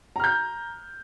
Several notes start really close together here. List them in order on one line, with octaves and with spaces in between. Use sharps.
A#5 F6 G6